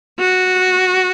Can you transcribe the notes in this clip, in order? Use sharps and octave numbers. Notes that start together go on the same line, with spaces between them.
F#4